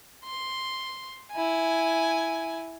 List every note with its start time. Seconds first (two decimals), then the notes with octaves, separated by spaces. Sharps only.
0.24 C6
1.32 E4 G#5